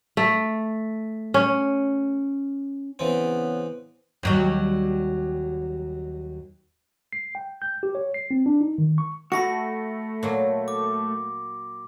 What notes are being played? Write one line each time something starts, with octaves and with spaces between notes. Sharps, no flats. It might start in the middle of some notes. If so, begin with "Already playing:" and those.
A3
C#4
C#3 E3 B3 C4
D#2 F#3 G3
C7
G5
G6
G4
C#5
C7
C4
D4
D#4
D#3
C#6
A3 F#4 B5 A#6 C#7
A#2 F#3
D6